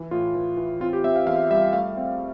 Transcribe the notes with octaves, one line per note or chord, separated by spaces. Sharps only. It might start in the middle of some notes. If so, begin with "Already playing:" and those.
Already playing: E3
A2 F4
E3
E3
C4 F4
G4
C4 E5
F5
E2 F5
G3 E5
A3 F5
C4